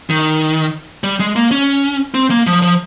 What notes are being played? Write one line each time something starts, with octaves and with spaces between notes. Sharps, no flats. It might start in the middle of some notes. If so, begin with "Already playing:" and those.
D#3
G3
G#3
A#3
C#4
C4
A#3
F3
F3